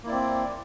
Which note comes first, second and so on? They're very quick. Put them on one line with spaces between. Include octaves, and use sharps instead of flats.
A#3 E4 D5 C4